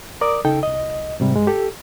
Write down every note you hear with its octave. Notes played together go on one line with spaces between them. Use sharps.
A#4 D5 D6 D#6
C#3 D#4 A4 G5
C2 D#5
G#2 C3 G3
G2 G#3
G4 A4